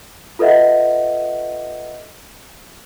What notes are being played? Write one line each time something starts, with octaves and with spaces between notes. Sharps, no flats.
F4 A4 B4 D#5 E5 F#5